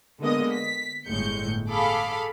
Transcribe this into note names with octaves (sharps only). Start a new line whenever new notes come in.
D3 G#3 A#3 B3 D#5 D#6
B6
G1 A2 G#3 G6 C#7
G#4 A4 F5 B5 D6